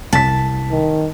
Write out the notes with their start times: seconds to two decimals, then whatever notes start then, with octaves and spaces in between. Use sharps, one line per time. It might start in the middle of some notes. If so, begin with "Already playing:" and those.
0.13 C2 A5 B6
0.72 D#3